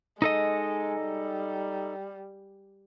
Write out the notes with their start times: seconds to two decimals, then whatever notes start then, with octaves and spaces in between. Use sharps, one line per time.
0.22 G#3 D#4 A4 D#5
1.03 G3